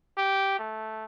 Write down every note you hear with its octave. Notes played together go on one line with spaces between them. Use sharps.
G4
A3